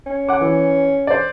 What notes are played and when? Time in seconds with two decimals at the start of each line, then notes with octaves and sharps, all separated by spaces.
0.06 C#4
0.29 F#5 D6
0.41 E3
1.07 C5 D5